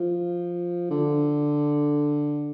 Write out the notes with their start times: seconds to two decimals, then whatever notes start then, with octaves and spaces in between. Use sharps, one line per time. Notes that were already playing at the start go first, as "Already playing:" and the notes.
Already playing: F3
0.90 D3